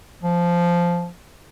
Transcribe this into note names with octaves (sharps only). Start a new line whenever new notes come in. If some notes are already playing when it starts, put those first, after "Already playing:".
F3